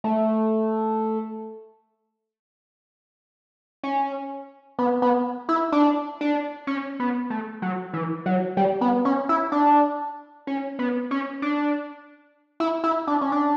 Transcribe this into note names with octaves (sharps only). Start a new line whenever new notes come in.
A3
C#4
B3
B3
E4
D4
D4
C#4
B3
A3
F#3
E3
F#3
G3
B3
C#4
E4
D4
C#4
B3
C#4
D4
E4
E4
D4
C#4
D4